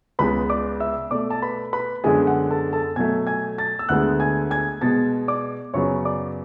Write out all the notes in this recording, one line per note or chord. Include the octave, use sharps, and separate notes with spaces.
C#2 C#3 G#3 B3 B4 B5
D5 D6
E5 E6
B2 A3 D5 D6
A5
B4 B5
B4 B5
F#2 D3 G#3 B3 G#4 G#5
F#5
A4 A5
A4 A5
B2 F#3 A3 G#5 G#6
G#5 G#6
A5 A6
E6
D2 D3 G#3 B3 F#5 F#6
G#5 G#6
G#5 G#6
B2 G#3 B3 A5 A6
D5 D6
F#2 C#3 F#3 B3 C#5 C#6
D5 D6